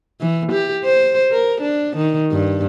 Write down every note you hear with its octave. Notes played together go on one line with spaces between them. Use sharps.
E3
G4
C5
A#4
D4
D#3
G2